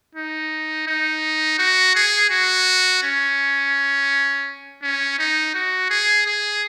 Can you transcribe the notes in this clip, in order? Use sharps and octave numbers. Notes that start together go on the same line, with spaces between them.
D#4
D#4
F#4
G#4
F#4
C#4
C#4
D#4
F#4
G#4
G#4